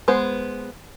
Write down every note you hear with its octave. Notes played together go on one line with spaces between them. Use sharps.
G#3 B3 C5